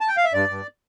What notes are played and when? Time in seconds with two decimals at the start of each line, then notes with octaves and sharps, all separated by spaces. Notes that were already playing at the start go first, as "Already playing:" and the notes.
0.01 A5
0.08 G5
0.17 F5
0.25 E5
0.33 G2 D5
0.49 G2